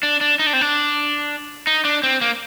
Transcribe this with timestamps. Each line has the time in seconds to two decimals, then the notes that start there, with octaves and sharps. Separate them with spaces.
0.03 D4
0.21 D4
0.39 D#4
0.46 D4
0.53 C4
0.61 D4
1.67 D#4
1.85 D4
2.03 C4
2.22 A#3